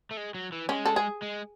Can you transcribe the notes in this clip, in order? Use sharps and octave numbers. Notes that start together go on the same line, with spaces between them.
A3
G#3
F#3
E3
G#3 C#4
A4
G#4
G#3